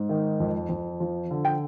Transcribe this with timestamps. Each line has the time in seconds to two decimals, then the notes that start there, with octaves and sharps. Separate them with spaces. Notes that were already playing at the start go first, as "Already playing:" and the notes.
Already playing: G#2
0.09 D#3
0.40 F2
0.69 F2
1.00 F3
1.31 D3
1.45 G5